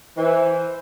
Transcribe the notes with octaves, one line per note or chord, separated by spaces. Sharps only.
E3 C5